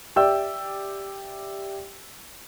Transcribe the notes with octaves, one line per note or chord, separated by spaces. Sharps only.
G4 D5 E5 G5 E6